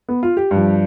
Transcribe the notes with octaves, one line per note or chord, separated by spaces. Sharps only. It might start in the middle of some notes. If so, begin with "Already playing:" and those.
B3
F4
G4
G2 F3